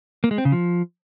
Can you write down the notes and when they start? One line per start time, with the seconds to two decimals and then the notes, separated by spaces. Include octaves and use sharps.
0.24 A#3
0.31 G#3
0.38 C4
0.45 C#3
0.52 F3